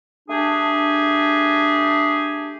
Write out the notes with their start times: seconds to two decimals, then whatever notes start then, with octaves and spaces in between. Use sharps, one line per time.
0.29 A3 D4 G4 G#4